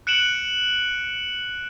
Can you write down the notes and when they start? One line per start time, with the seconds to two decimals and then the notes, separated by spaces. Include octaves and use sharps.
0.07 F#6 C#7 D7 E7 F#7